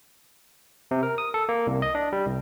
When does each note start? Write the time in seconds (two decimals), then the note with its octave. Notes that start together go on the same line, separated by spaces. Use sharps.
0.91 C3
1.03 A#4
1.18 D#6
1.34 A4
1.49 A#3
1.67 C2
1.82 D#5
1.95 D4
2.12 G3
2.27 C2